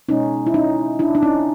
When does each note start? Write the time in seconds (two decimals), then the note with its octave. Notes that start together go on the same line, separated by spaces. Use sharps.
0.09 B2 G#3 C#4 D#4
0.46 E4
0.54 C#4 D#4
0.99 D4 E4
1.15 D4
1.23 C#4 D#4